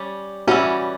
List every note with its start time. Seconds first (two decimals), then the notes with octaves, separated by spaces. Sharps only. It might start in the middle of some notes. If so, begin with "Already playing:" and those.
Already playing: G3 C#4
0.47 E3 G3 C#4 F#4